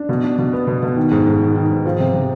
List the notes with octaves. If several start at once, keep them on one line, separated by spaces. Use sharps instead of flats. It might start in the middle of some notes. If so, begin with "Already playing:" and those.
Already playing: D4
B2
D4
B2
B3
B2
B2
D#3
G#2
G#2
D#3
D#3
G#2
F3
C3
C3